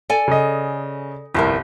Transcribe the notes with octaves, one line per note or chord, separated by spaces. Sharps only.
A4 D5 G#5
C#3 D#5
G1 C2 F2 E4 A#4